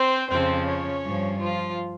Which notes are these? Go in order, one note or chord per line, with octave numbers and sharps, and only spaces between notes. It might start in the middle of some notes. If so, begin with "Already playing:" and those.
Already playing: C4 C5
F2 C#3 F3 C4 C5
C#4 C#5
G2 F3
F3 F4